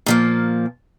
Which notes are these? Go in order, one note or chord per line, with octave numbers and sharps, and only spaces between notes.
A#2 F3 A#3